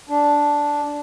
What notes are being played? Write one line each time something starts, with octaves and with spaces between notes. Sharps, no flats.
D4